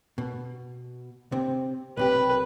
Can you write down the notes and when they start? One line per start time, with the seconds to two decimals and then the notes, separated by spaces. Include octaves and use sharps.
0.18 B2
1.32 C3 C4
1.97 B1 C3 G4 B4